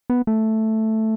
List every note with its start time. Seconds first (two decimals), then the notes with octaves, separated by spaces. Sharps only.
0.10 B3
0.27 A3